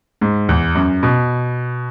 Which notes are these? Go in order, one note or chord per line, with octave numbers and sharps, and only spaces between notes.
G#2
E2
F#2
B2